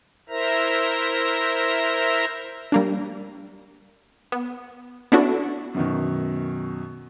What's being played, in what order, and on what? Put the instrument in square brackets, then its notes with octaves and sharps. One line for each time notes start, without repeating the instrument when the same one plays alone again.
[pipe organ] E4 A#4 C5 E5 A#5
[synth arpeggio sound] G3 A#3 D4
B3
B3 C#4 D4 E4 F#4 A4
[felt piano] F#2 B2 D#3